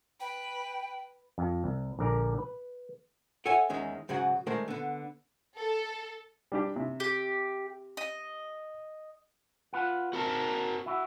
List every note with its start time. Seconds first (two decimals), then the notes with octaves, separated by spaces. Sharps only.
0.20 B4 G5
1.38 F2
1.64 C2
1.99 A#1 D3 A#4 D5 A#5
2.39 B4
3.46 A4 C#5 E5 F#5 G#5
3.70 E2 D#3 G#3 C#4
4.09 G#2 C#3 F#3 G#4 F#5
4.47 D#3 G#3 A3 A#4 C5 D5
4.68 D3 B3
5.57 A4
6.52 G3 D4 G4
6.76 C3
7.00 G4
7.97 D#5
9.73 F4 B4 F#5
10.13 C4 F#4 A#4 A5
10.86 E4 F#4